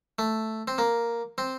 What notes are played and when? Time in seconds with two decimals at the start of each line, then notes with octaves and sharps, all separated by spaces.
0.19 A3
0.68 C4
0.78 A#3
1.38 C4